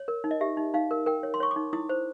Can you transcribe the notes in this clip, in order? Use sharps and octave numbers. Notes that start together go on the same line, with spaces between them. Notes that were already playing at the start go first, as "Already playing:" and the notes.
Already playing: C#5
A#4
D#4
D#5
G4 E5
D#4
D#4 F5
A#4
A#4 G5
C#5
C6
C#5 C#6
D6
D#4
E4 D#6
C5